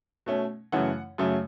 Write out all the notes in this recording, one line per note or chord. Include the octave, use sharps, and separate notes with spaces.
B2 A3 C#4
F#2 C#3 E3 A3 F#5
F#2 C#3 F#3 A3